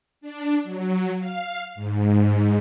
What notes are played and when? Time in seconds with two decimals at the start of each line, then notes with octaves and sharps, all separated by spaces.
0.21 D4
0.63 F#3
1.19 F5
1.75 G#2